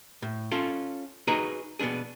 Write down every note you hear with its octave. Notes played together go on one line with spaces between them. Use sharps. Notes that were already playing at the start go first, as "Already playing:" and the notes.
A2
C#4 F4 A4
D#4 F#4 G#4 B4 D#5 A#5
B2 B3 C4 D4 G#4